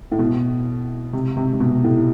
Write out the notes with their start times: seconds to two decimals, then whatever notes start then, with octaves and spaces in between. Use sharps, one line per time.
0.12 A2
0.19 B2
1.13 C3
1.37 C3
1.53 C3
1.60 B2
1.84 A2